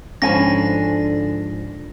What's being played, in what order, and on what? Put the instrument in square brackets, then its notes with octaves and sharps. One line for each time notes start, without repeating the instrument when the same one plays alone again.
[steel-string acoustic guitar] G#2 F3 D4 [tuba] D3 [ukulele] C#4 G#5 B5 [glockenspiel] A#6